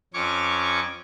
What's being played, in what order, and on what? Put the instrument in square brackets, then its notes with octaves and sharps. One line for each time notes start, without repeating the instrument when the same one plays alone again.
[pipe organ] F2 C#4 C#5 C#6 D6